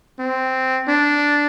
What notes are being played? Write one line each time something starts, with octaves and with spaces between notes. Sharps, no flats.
C4
D4